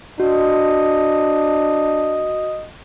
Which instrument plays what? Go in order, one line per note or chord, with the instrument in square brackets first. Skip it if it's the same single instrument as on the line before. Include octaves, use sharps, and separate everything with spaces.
[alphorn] D4 [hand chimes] F#4 [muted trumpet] D#5